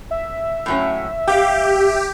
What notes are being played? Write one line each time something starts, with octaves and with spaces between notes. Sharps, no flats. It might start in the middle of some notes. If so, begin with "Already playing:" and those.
E5
A2 F#3 C#4
G4 F5 G5